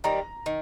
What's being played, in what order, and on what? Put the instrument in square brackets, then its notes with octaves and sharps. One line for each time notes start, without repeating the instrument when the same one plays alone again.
[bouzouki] D#3 G3 C4 [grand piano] A#5
[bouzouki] D#3